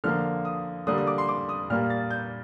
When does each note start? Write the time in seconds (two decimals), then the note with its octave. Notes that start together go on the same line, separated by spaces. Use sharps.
0.04 D3 F3 A#3 F6
0.45 D#6
0.87 D3 G3 A#3 D#6
0.98 D#6
1.07 D6
1.18 C6
1.28 D6
1.49 D#6
1.70 A#2 G3 A#3 F6
1.90 A6
2.11 G6